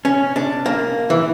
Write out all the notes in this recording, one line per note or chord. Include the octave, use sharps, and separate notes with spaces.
C#4
D4
A#3
E3